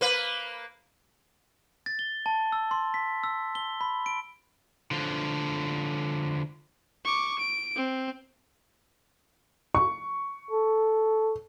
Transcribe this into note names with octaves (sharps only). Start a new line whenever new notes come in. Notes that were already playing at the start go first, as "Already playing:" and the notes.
A#3 B4
A6
G7
A5
E6
C6
B6
E6
G7
B5
D7
D3 F3
C#6 D6
D7
C4
C#6
A4